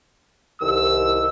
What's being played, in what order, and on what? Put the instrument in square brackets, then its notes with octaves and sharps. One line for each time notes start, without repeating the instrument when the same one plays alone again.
[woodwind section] C2 D#3 [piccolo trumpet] E6